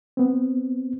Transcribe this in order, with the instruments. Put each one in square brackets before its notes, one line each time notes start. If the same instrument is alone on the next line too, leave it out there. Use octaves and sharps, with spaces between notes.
[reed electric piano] B3 C4